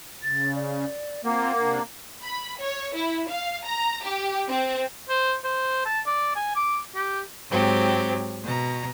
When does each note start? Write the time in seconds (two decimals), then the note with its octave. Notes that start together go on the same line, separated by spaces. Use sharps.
0.23 C#3 A6
0.55 D5
1.25 A#3 C4 F4 F#5
1.59 C3 D4
2.23 B5
2.59 C#5
2.95 E4
3.29 F5
3.65 A#5
4.04 G4
4.49 C4
5.09 C5
5.44 C5
5.85 A5
6.06 D5
6.36 G#5
6.56 D6
6.95 G4
7.50 G#2 F#3 C4 G4
8.44 B2 A#5